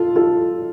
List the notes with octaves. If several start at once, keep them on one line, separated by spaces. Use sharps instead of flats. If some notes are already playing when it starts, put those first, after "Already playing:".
Already playing: F4 A4
F4 A4